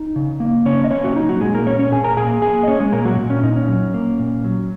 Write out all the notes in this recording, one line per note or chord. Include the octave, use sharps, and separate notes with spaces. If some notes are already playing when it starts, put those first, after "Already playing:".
Already playing: D#4
C#3
A#3
C#3 C#4 C#5
D#5
A#3 C#4 C#5
F#4
F#3 D#4
F#3 F#4
A#2 G#3 G#4
A#3 A#4
A#2 C#4 C#5
C#4 C#5
A#2 G#4 G#5
A#4 A#5
A#3 G#4 G#5
A#3 G#4 G#5
D#5
A#3 C#4 C#5
G#3 G#4
A#2 A#3 A#4
F#3 F#4
A#2
C#4
A#2 D#4
C#4
F#3
A#3
A#2
F#3